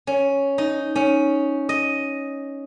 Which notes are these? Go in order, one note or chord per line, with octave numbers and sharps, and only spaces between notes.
C#4
D#4
C#4
D#5